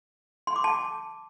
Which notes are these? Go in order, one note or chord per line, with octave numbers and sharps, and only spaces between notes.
C6
D6
A5